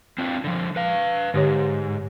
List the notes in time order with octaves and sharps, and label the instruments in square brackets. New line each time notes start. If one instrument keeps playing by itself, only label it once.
[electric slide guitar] C4 D4 F4
D3 F3
B4 F5
[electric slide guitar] G#2 [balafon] D3 G4 C#5